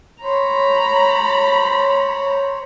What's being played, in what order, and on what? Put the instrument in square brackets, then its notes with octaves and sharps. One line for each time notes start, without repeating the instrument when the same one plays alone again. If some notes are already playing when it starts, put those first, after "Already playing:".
[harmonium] C5 C#5 [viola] A#5 B5